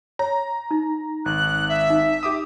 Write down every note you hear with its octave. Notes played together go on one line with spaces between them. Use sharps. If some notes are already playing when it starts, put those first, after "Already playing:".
C#5 A#5
D#4
G#1 F#6
E5
D#4
G4 D6 D#6